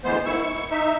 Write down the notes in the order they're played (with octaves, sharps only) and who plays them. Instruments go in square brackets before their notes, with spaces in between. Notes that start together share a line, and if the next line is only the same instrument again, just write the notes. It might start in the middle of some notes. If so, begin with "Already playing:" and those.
[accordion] D2 E3 G#3 B3 C5
D#3 E4 C#6 E6
C#6
D#4 E5